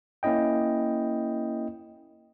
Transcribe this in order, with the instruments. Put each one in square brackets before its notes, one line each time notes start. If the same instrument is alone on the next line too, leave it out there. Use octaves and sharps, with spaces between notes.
[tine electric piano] A#3 C#4 E4 D#5 G5